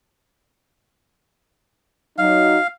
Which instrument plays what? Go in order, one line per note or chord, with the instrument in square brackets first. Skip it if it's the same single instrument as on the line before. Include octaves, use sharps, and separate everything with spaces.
[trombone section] F#3 D#4 [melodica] F5